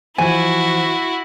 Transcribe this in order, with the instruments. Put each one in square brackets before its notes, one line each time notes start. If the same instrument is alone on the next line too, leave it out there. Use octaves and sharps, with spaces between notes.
[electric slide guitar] E3 F3 C5 [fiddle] E4 F#4 [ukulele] G#5